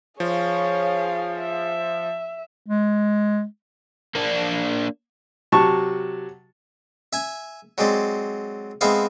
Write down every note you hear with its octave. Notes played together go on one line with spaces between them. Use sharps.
F3 G#4 C#5 F5
E5
G#3
A#3 D4
C3 F#3 A5 C#6
E5 G#5
F#3 G#3 C4 D5
G#3 B3 C4 E5 F5